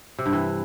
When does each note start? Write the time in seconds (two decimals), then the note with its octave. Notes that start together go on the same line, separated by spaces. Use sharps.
0.18 C3
0.26 G2
0.33 E3